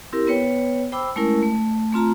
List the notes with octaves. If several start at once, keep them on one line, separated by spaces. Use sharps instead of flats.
C4 E4 G4 A#4
B3 B4 C#5 G5
C5 G5 B5 D6 E6
G#3 A3 C#4 E4 A#4
A3
A3 C4 F4 A#5